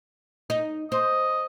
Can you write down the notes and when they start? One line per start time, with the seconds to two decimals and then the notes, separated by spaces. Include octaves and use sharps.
0.50 D#4
0.92 C5 D#5